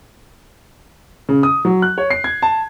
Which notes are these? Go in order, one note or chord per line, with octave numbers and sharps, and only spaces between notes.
C#3
D#6
F#3
F#6
C#5
C7
G#6
A5